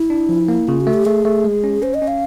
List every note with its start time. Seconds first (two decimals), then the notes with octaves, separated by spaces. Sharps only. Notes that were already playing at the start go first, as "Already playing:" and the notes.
Already playing: E4
0.10 D4
0.29 F3
0.48 A#3
0.67 C#3 F4
0.81 F#4
0.87 A3
0.94 G4
1.05 A3 G#4
1.25 A3
1.44 G#3
1.64 C#4
1.82 C#4 C5
1.94 D#5
2.02 C#4
2.08 F5